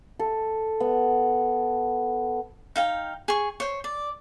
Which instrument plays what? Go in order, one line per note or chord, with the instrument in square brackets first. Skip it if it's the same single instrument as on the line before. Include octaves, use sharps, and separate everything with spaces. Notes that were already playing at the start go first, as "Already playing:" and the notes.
[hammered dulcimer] A4
B3
[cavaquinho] D#4 F5 G5
G#4 C#6
C5 C#5
D5